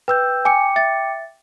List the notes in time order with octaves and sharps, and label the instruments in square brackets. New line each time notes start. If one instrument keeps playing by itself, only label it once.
[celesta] B4 [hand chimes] G5 E6 G6
[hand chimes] G5 D6 C#7 [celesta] G#5
[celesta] E5 A6